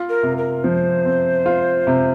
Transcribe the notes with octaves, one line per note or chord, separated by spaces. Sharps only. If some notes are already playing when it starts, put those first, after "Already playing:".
Already playing: F4
A#4
C3
A#4
F3 C5
C4
F4
C3